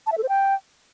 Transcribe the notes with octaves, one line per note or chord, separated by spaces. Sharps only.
A5
E5
A4
C5
G5